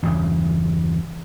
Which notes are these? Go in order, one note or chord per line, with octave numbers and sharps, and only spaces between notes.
E2 G2 C#3